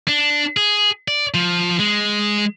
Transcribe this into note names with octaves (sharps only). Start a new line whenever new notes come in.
D4
G#4
D5
F3
G#3